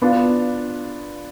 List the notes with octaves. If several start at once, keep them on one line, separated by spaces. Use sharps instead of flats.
B3 D4 F4